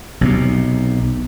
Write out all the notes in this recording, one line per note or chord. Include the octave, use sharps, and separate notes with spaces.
B1 C3